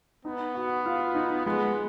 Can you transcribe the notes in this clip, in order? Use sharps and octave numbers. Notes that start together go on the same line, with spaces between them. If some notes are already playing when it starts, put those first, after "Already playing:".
B3 D#4
F#4
F4
D#4
G#3 B3